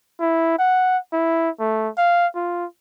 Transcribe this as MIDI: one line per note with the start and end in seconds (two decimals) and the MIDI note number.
0.20 0.56 64
0.59 0.98 78
1.13 1.50 64
1.60 1.89 57
1.98 2.27 77
2.35 2.65 65